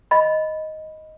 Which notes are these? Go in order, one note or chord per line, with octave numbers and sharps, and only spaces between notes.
D#5 B5